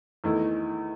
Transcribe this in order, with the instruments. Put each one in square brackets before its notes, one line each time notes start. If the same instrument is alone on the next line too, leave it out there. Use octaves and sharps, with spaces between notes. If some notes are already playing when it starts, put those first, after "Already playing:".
[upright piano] E2 D#3 A3 E4